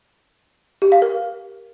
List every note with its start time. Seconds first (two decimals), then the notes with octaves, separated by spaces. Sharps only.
0.82 G4
0.92 F5
1.02 A#4